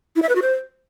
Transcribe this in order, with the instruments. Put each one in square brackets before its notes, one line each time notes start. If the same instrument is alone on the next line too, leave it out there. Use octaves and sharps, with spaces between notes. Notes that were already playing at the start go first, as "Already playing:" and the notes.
[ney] E4
E5
B4
F#4
C5